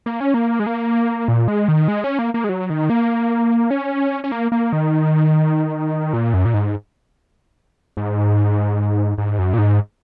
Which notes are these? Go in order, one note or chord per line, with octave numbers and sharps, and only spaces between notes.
A#3
C#4
A#3
G#3
A#3
A#2
G#3
D#3
G#3
C#4
A#3
A#3
G#3
F#3
D#3
A#3
C#4
C#4
A#3
A#3
D#3
A#2
F#2
A#2
G#2
G#2
G#2
F#2
A#2
G#2